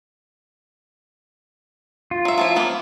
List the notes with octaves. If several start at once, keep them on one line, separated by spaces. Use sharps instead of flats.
F4
F#3 E5
F3 F#3 E4
E3 A#3 B3